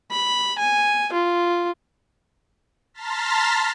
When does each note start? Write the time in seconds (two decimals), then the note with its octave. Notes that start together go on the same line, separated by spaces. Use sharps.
0.11 B5
0.59 G#5
1.13 F4
2.94 A5 A#5 C6 F6 A6 B6